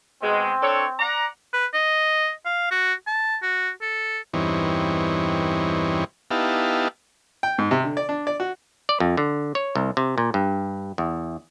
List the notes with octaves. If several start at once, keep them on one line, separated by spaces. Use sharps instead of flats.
B2 G#3 C4
D4 A4 C#5
D5 F#5 A#5
B4
D#5
F5
F#4
A5
F#4
A4
E2 G2 E3 C4 D#4 C#5
B3 D#4 E4 G4 F5 A5
G5
G#2
C3
D3
D5
D4
D5
F#4
D5
F2
D3
C#5
C2
C3
A#2
G2
E2